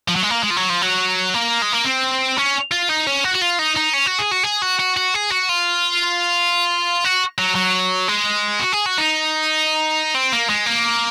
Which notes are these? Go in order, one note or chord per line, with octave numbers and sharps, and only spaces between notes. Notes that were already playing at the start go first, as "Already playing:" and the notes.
F3
F#3
G#3
A#3
G#3
F3
F#3
F3
F#3
A#3
G#3
A#3
C4
C#4
F4
D#4
C#4
F#4
F#4
F4
D#4
D#4
C#4
F#4
G#4
F#4
G#4
F#4
F#4
F#4
G#4
F#4
F4
F#4
F#3
F#3
G#3
F#4
G#4
F#4
D#4
C4
A#3
G#3
A#3